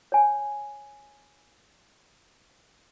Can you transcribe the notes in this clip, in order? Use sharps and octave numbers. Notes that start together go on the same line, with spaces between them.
C#5 G#5